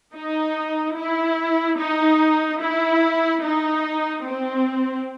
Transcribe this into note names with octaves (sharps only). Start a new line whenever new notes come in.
D#4
E4
D#4
E4
D#4
C4